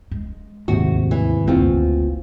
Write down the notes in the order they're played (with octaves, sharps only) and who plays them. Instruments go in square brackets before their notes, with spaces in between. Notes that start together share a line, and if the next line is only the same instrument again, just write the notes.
[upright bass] G#3
[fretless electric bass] D#2 G#2 C3 [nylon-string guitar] F#4
[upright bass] D2
[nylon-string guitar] E3
[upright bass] F#1 D2 [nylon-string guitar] C4 F4 F#4